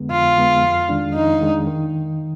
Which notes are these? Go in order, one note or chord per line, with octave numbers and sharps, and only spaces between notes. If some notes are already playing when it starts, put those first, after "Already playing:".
Already playing: F2 D3 G#3 B3
F2 F4
D3 G#3 B3
F2
D#3 G#3 D4
F2 D#4
D#3 G#3 D4
D#3